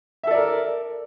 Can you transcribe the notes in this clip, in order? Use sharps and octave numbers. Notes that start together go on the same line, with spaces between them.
A4 A#4 D5 E5